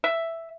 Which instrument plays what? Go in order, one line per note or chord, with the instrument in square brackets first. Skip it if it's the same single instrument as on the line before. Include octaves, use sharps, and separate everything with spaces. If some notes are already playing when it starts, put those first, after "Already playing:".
[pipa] E5